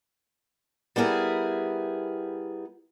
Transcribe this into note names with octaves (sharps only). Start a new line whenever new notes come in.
G3 B3 E4 G#4 A#4